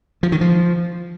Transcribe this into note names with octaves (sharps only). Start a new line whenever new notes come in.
F3
D#3
F3